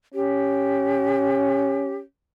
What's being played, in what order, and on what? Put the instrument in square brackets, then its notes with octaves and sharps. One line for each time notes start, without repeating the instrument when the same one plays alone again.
[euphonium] C#4 [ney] G4